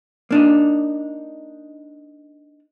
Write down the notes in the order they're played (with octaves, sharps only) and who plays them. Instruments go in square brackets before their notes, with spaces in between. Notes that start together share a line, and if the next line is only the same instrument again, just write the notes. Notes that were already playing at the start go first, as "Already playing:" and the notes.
[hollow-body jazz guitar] A#3 D4 D#4